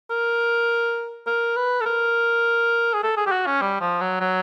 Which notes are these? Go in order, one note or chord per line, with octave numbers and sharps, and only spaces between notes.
A#4
A#4
B4
A4
A#4
G#4
A4
G#4
G4
F#4
C#4
G3
F3
F#3
F#3